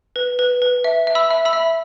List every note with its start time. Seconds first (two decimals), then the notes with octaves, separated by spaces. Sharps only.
0.16 B4
0.39 B4
0.62 B4
0.84 E5
1.07 E5
1.15 B5 E6
1.30 E5
1.45 B5 E6
1.53 E5